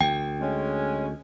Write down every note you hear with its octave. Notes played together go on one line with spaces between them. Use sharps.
D2 G5
G#3 C#4